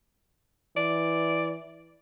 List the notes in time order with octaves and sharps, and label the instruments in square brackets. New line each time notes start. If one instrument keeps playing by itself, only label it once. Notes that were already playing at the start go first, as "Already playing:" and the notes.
[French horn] E3 [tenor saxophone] D5